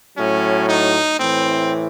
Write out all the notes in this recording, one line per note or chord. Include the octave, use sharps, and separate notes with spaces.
A2 F#3 C#4
D#4
A2 E3 C4